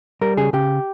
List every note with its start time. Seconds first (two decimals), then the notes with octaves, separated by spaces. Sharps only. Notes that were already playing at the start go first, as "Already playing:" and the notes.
0.21 G3 A#4
0.37 C#3 G#4
0.53 C#3 G4